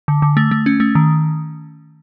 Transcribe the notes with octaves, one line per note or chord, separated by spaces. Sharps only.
D3
D3
A3
A3
C#4
A3
D#3